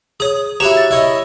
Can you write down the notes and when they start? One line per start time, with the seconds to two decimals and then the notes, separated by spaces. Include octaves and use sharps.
0.20 G#4 C#5 D#6
0.60 E4 F#4 G4 C#5 A#5 E7
0.77 A6
0.91 E4 C#5 D#5